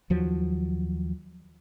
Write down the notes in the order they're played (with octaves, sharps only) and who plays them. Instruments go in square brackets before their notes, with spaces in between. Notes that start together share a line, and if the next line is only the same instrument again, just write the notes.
[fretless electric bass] D#2 F3 F#3